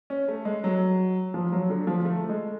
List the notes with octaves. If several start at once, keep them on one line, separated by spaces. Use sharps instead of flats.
C#4
A3
G#3
F#3
F3
F#3
D3
F3
A3
G#3